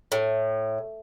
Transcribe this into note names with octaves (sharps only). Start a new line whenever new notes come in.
A2